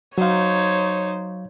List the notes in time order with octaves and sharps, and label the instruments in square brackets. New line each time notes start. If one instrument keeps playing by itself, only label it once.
[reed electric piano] F#3 F5 [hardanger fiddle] D#4 C5 [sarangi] C#5